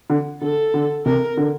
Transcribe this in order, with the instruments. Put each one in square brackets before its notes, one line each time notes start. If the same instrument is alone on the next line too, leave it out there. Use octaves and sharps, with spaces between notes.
[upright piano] D3
[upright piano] D3 [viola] A4
[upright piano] D3
[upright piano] C3 [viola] A#4
[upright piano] D3